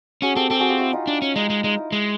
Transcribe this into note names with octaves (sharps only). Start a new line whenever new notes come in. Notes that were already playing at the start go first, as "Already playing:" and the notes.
C#4 F#4 G#4
C4 G4 A4
C4 G4 A4
F#4 G#4
F4 G4
E4 F#4
D#4 F4
D4
C#4
G#3 D#4
G#3
G#3 D#4
E4
G#3